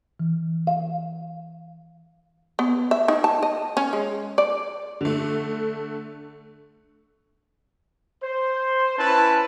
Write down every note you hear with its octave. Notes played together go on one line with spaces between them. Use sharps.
E3
F5
B3
E5
D#4
A5
D#5
C#4
G#3
D5
D3 A3
C5
C#4 E4 B4 A5